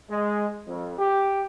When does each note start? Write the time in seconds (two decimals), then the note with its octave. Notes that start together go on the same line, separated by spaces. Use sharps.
0.10 G#3
0.67 F2
0.98 G4